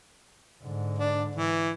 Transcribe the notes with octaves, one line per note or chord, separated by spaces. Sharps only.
G#2 D3
D4
E3